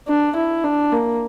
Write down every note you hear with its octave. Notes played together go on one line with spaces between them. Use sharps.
D4
E4
D4
A#3